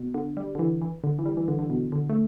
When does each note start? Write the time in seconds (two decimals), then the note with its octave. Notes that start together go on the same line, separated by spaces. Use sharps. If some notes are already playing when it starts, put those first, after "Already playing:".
Already playing: B2
0.14 D3
0.37 G3
0.55 D3
0.59 E3
0.81 E3
1.04 D3
1.19 E3
1.26 G3
1.37 E3
1.48 D3
1.59 D3
1.70 B2
1.92 D3
2.09 A3